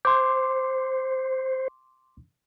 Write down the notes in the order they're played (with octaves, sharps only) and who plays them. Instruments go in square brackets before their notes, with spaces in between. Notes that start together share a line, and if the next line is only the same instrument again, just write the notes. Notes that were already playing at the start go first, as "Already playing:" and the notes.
[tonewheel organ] C5 [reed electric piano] C6 D6